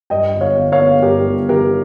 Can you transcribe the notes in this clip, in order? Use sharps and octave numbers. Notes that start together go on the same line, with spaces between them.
G2 D#5 G5
G1
C#5 F5
G1
C#5 F5
G1
G2 G4 A#4
G1
D#3 G4 A#4